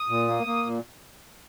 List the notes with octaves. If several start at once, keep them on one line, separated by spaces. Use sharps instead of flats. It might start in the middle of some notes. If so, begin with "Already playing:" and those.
Already playing: D#6
A#2
A#3
A#3
A#2